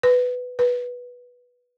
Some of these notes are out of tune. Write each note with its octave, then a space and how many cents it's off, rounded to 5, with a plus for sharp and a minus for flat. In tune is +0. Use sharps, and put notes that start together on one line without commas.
B4 +10
B4 -10